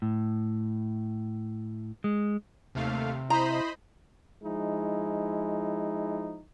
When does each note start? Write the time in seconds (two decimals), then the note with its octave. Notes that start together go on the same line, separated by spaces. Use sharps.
0.02 A2
2.04 G#3
2.75 D#2 C3 A3 F5
3.30 E4 C5 D#5 A#5 B5
4.43 F3 G#3 D#4 E4